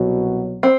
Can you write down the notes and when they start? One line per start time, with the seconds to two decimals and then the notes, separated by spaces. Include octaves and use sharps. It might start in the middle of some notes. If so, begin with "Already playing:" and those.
Already playing: C2 B2 F#3
0.63 C4